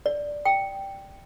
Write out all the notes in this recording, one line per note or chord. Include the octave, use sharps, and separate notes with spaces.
D5
G5